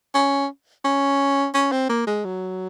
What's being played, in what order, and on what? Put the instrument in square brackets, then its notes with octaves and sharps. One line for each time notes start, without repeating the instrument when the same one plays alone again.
[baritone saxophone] C#4
C#4
C#4
C4
A#3
G#3
F#3